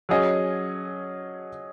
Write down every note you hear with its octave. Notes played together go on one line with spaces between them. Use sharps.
F#3 C#4 G#4 D#5